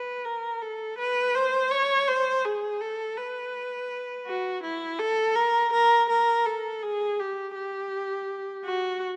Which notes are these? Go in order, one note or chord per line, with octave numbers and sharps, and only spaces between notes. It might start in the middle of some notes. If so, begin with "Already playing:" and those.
Already playing: B4
A#4
A4
B4
C5
C#5
C5
G#4
A4
B4
F#4
E4
A4
A#4
A#4
A#4
A4
G#4
G4
G4
F#4